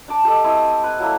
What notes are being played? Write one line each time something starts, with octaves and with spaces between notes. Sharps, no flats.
D4 A5 D6
G4 A4 D#5
C4 E4 D#5
B4 F#5
F#3 A#3 E4 A4